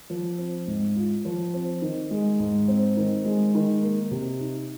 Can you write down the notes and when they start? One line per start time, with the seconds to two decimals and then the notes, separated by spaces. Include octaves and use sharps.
0.10 F3
0.38 C4
0.67 G#2
0.96 F4
1.25 F3
1.54 C4
1.82 D#3
2.11 G#3
2.40 G#2
2.68 C4
2.97 D#3
3.25 G#3
3.55 D#3
3.82 A#3
4.11 C3
4.40 D#4